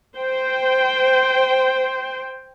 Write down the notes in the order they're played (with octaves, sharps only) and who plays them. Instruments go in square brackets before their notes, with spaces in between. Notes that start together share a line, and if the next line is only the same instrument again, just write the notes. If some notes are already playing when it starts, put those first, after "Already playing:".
[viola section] C5 G5